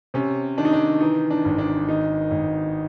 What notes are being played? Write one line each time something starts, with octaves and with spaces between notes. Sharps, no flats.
C3 C#4
D#3 D4
D#4
D4
E3 D#4
D4
G#1
D4
D#3 D#4
G#1